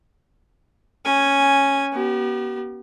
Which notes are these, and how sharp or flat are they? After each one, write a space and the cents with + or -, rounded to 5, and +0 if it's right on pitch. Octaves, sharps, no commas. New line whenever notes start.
C#4 +0 G#5 +0
B3 -35 G4 -40